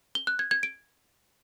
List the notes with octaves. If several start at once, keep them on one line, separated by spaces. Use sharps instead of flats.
G7
F#6
G#6
G#6
D7